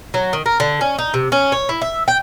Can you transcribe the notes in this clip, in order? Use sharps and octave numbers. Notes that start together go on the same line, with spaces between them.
F#3
D#3
A#4
D3
C#4
D#4
C3
C#4
C#5
E4
E5
G5